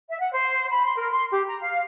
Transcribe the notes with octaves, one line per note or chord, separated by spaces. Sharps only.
E5
F#5
C5
B5
C6
A#4
C6
G4
A#5
F5